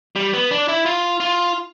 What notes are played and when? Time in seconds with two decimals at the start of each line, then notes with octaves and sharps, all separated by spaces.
0.16 G3
0.33 B3
0.51 D4
0.68 E4
0.86 F4
1.20 F4